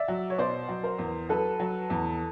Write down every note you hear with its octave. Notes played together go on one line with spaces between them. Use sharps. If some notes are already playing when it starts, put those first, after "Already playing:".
Already playing: D5 E5
F#3
C#5
B2 C5 D5
F#3
A#4 C5
E2
F#3 A4 B4
F#3
E2